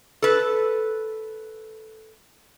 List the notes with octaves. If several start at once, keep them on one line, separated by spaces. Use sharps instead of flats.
A4 B4